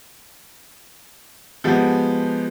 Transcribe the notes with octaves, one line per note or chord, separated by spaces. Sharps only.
F3 G#3 B3 G4